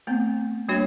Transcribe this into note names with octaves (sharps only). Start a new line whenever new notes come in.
A3 B3 C4
G3 A#3 D4 F#4 C#5